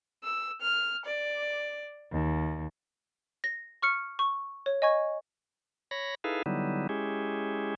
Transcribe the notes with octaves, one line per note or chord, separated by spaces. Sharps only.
E6
F6
D5
D#2
A#6
C#6 F6 C#7
C#6
C#5
D#5 G#5 C#6 G#6
C#5 B5 A#6
D#4 E4 G#4 A4 B4 F5
D3 F#3 G3 B3 D#4 E4
G#3 C#4 E4 G4 G#4